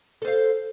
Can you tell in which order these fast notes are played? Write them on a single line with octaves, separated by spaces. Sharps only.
A4 C5 F5